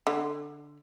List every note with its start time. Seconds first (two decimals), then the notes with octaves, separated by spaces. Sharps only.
0.07 D3